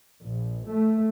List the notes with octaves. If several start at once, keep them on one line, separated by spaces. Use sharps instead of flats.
A#1
A3